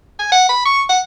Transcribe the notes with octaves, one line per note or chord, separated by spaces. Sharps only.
G#5
F#5
B5
C#6
F#5